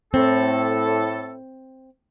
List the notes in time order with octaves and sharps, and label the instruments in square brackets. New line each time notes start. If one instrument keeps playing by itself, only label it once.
[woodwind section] A2 A4 [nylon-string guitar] C4